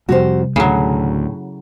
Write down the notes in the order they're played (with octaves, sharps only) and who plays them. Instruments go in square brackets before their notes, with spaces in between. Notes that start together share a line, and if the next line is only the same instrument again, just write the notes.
[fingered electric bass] F2 [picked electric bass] C3 G3 [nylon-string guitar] F#4 G4 C5
[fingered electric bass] D2 [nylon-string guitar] A2 [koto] C#3 F#3